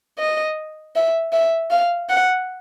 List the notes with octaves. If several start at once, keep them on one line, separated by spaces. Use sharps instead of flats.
D#5
E5
E5
F5
F#5